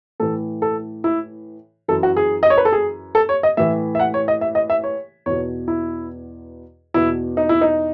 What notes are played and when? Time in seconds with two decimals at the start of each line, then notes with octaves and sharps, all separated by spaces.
0.20 A2 E3 A4
0.62 A4
1.04 E4
1.88 F#2 E3 A4
2.03 F#4
2.17 G#4
2.43 D#5
2.50 C#5
2.58 B4
2.65 A4
2.73 G#4
3.15 A4
3.29 C#5
3.43 D#5
3.57 A2 E3 E5
3.95 E5
4.00 F#5
4.14 C#5
4.28 D#5
4.41 E5
4.55 D#5
4.70 E5
4.84 C#5
5.26 E2 B2 C#5
5.68 E4
6.94 E2 B2 E4
7.37 D#4
7.49 E4
7.61 D#4